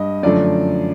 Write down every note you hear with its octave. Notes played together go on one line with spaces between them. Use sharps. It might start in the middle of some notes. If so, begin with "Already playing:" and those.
Already playing: G2 D#5
F#2 D3 F3 A3 D5